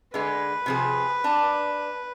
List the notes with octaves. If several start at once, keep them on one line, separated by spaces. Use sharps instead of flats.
D3 G#3 B4
C3 F3 G#4
D4 A5